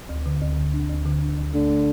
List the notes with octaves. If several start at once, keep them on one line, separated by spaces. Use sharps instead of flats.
D2
D3
D2
D3
D4
D2
D3
D4
D2
D3 A3
A3